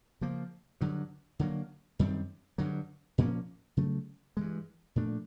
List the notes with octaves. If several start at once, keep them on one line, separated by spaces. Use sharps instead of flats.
C#3 F3 A#3
G2 D3 F#3
D3 F#3 A#3
F#2 D#3 G3 C4
G2 D3 F#3
A#2 F3 A#3 C#4
C#3 F#3 A3
G2 E3 G#3
A#2 F3 A3 D4